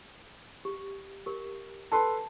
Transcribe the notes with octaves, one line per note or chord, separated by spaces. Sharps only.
G4
G4 A#4
A4 B4 A5 C6